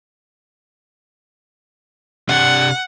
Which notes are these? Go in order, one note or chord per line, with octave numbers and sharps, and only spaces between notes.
C3 D4 F#5